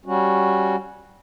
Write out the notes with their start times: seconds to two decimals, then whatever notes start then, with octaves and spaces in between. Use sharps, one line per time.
0.06 G3 C#4 F#4